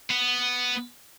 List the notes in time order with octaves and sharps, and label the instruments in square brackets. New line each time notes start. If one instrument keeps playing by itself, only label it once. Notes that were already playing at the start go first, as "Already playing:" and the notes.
[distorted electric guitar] B3